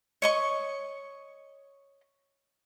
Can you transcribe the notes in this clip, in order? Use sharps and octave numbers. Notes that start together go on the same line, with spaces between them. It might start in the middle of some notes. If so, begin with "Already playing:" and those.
C#5 D#5 C#6